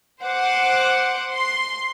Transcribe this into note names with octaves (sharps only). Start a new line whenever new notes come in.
C5 F#5 C6 D6
C6